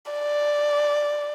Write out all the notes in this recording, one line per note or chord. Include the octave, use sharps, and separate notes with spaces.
D5